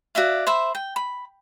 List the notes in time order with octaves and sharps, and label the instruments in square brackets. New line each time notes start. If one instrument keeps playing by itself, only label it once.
[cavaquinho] F#4 D5 E5 F5
C5 E5 B5
G5
B5